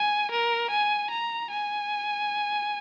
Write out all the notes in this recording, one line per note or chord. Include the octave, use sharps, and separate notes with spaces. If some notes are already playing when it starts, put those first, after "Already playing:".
Already playing: G#5
A#4
G#5
A#5
G#5